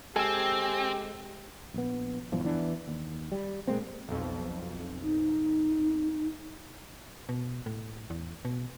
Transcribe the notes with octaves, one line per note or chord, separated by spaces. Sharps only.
G#3 C4 G4 A4 G#5 E6
A#1 B3
A#1 E2 G2 F3
E2 E3 B3 D4
D#2
G3
A#2 G#3 A#3 C4
B1 F2
D#4
B2
A2
E2
B2